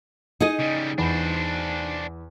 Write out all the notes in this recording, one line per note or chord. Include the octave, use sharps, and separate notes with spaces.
D#4 G#4 D#5
C#3 G3
E2 D4 C5 B5